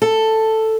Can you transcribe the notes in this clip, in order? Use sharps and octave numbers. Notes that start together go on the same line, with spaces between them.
A4